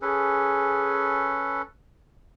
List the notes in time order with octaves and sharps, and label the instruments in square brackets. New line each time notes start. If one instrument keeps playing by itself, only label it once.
[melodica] C#4 A4 B4 [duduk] G#4